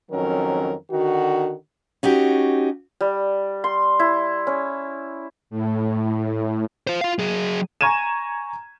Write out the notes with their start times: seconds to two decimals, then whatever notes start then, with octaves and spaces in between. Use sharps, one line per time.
0.11 F2 D#3 F#3 C#4 A#4
0.91 D3 D#3 F#4
2.03 C#4 D#4 F#4 G4
3.01 G3
3.64 C6
3.99 E4
4.47 C#4
5.50 A2
6.87 F4 C5
7.01 F4 F5
7.19 F#3 G#4
7.81 G#5 A#5 C#6 G#6 D#7 E7